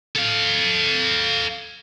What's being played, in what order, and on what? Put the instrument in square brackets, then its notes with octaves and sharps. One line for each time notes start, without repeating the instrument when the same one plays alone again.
[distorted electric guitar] A4 F5